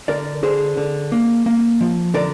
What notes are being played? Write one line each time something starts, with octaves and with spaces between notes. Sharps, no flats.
D3 A#4 D5
D3 G#4 C5
D3
A#3
A#3
F3
D3 A#4 D5